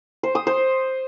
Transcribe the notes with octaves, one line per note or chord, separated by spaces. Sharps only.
C5
D#6
C5